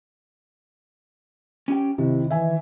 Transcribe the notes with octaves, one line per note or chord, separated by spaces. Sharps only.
C#4 G4 G5
C3 D#3 E4
E3 E5 G#5